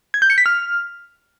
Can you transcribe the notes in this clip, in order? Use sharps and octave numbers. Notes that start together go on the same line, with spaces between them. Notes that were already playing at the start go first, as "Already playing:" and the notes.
G#6
G6
C#7
B6
F6